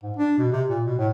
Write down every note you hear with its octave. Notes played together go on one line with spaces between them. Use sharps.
G#2
D4
B2
C3
A#2
B2
A2